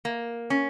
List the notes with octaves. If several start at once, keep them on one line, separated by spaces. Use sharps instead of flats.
A#3
C#4